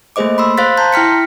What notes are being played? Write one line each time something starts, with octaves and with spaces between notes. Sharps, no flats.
A3 A#3 G#4 C5 D#5 D6
B5 C6 E6
C5 F5 C6 F#6 A6 B6
A5 A#5 C6 G6
E4 G5 F6 B6 C#7